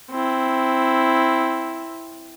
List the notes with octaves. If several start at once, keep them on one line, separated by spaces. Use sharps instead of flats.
C4 E4